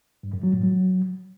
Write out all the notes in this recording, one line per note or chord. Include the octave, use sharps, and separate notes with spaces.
G2
F#2
F#3
A2
F#3